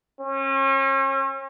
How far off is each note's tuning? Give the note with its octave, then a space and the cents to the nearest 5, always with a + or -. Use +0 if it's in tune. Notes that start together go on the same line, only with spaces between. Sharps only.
C#4 -40